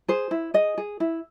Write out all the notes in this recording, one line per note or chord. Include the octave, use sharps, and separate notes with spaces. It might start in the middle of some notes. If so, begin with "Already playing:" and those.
G#4 C5
E4
G#4 D#5
G#4
E4